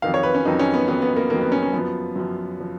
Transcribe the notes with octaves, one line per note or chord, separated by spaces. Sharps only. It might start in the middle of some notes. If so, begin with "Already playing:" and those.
F2 D#3 F#3 F5
C#5
B4
C#4
F2 D#3 F#3 D#4
C#4
B3
F2 D#3 F#3 B3
B3
A#3
F2 D#3 F#3 A#3
B3
C#4
C#4
F#2 F3 B3
F#2 F3
F3